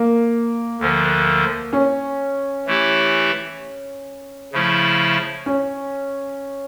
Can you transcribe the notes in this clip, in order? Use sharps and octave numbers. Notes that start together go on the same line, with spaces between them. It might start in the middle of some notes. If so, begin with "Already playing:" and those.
Already playing: A#3
D2 D3 F3
C#4
E3 A3 E4 G4
C#3 F3 A3 E4
C#4